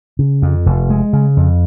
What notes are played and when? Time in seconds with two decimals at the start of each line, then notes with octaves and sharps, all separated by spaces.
0.19 C#3
0.42 F2
0.66 F1
0.90 G#3
1.13 C#3
1.37 F2